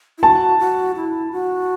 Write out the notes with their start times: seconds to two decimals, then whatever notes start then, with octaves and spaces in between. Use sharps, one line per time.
0.18 E4
0.23 F#4 A5
0.59 F#4
0.96 E4
1.32 F#4